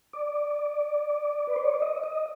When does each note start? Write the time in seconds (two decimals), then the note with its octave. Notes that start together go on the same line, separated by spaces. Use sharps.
0.13 D5
1.47 B4
1.56 C5
1.65 C#5
1.74 D5
1.82 D#5
2.03 D#5